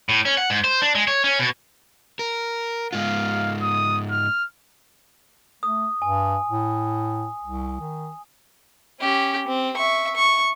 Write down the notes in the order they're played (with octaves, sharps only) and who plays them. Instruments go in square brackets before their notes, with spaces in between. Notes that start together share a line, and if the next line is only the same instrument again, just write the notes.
[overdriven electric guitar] A2
C#4
F#5
G#2
C5
D4
G#3
C#5
C#4
B2
A#4
[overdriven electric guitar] G#2 F4 [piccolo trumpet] F5
[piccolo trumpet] D#6
F6
[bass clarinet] A3 [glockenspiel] D#6
[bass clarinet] G2 [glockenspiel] G#5
[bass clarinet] A2
C2
D#3
[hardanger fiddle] C#4 G4
C4
E5 C#6
C#6